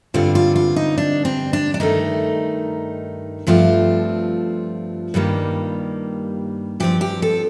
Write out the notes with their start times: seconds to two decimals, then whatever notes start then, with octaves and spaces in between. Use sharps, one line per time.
0.14 G2 D3 G3 C4 F4
0.35 F4
0.56 F4
0.76 D#4
0.98 D4
1.25 C4
1.53 D4
1.74 D4
1.80 G2 D#3 A3 D#4
3.47 G2 F3 A3 C4 F4
5.14 G2 D#3 G3 A#3
6.80 G2 F3 C4 G4
7.01 G4
7.22 A4